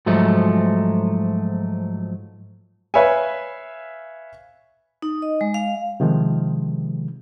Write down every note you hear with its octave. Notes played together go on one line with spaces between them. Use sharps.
G#2 F3 F#3 A3
B4 C#5 E5 F5 G#5
D#4
D#5
G#3
F5
C3 D#3 F3 G#3